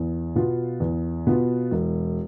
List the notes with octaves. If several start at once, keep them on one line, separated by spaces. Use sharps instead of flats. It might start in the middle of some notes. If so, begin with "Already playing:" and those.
Already playing: E2
B2 B3 F4
E2
B2 B3 F4
E1